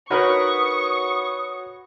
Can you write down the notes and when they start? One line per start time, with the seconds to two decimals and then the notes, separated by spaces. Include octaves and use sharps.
0.10 D#4 F#4 A#4 B4 C#5 B5 C#6 D#6